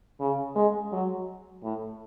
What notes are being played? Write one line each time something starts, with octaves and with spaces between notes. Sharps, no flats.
C#3
G#3
F#3
A2